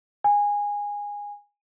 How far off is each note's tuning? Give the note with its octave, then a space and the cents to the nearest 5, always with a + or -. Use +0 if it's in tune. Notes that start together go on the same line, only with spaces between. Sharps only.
G#5 -20